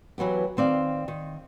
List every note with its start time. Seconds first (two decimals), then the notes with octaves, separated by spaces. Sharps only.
0.18 E3 F#3 B3 G4
0.57 D#3 C4 D5 F5
1.08 D#3